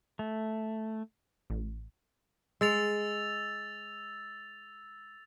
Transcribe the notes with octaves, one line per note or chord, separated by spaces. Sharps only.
A3
A1
G#3 E6 A6 F7